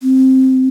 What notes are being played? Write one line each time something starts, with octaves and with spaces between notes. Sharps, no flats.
C4